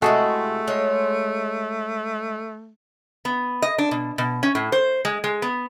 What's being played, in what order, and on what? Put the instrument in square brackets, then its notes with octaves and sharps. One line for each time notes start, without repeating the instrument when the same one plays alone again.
[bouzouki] C3 G#3 E4 [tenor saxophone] A3 [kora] F#4 G#4 A4
[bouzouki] G#3 C#5
[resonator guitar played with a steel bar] B3
D#5
D4
B2
B2
C#4
A2
C5
G#3
G#3
B3